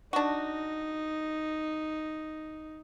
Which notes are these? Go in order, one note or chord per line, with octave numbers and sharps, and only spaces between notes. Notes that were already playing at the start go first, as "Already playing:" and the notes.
D4 D#4 F#4